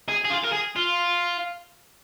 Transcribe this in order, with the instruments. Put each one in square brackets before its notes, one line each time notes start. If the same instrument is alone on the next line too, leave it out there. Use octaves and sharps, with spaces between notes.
[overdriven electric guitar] G#4
G#4
F4
A#4
G#4
F4